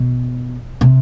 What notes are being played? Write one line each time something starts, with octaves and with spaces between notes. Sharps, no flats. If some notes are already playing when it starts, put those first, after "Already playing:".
Already playing: B2
C3